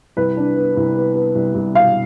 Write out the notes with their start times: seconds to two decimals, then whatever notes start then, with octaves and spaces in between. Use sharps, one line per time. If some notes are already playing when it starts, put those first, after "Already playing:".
0.17 C2 B4
0.37 D4
0.56 B3
0.77 C2
0.97 B3
1.15 B3
1.35 C2
1.55 C2
1.74 B2 F5